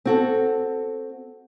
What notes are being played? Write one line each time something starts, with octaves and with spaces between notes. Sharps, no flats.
C4 F#4 A4